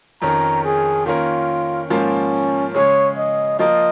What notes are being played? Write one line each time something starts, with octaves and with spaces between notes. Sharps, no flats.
F2 D#3 C#4 A#4 A#5
G#4
D#3 A#3 C#4 F4 A#4
G#2 F3 A#3 C#4 F4 A#4
C#3 G#3 C#4 G#4 C#5
D#5
F3 A#3 F4 A#4 D#5